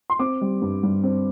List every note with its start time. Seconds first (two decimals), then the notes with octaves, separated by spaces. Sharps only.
0.10 C6
0.19 C4 D6
0.41 G3
0.62 G2
0.83 G2
1.03 C4